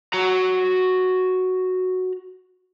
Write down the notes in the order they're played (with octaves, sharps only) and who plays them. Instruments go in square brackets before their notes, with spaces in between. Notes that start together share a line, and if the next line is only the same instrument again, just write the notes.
[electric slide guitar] F#4 A#5